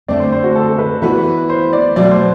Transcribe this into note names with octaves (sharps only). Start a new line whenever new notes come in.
D3 A3 C4 D5
C5
C5
F#4
A4
B4
E3 B3 F#4 B4
C5
D5
B2 F#3 A3 D5
C5